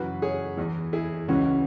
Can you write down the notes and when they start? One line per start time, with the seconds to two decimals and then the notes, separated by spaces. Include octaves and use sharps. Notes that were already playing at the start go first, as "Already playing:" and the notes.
Already playing: F#2 C#3 E3 F#4 B4
0.22 G#4 C#5
0.57 E2 E3
0.93 E4 G#4
1.28 C#2 C#3 E3 C#4 F#4